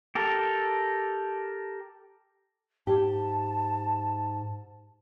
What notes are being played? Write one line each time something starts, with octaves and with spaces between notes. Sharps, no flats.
G4 A4 A#4
G#2 G4 A5